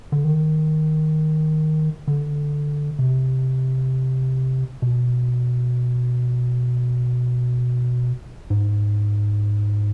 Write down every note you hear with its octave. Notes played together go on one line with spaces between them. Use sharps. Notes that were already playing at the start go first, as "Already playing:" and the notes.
D3
D#3
D3
C3
B2
G#2